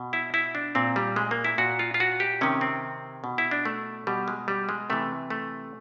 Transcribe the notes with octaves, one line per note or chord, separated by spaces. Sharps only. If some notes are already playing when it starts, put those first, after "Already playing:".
Already playing: B2
E4
E4
D4
A#2 C4
G3
G#3
A#3
E4
A#2 F#4
F4
F4
F#4
G4
C3 D#3 C#4
C4
B2
E4
D4
A3
B2 G3
G#3
G3
G#3
C3 E3 A3
A3